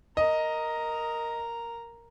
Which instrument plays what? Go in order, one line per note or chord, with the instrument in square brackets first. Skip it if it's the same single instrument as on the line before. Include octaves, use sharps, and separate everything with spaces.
[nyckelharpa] A#4 A#5 [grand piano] D#5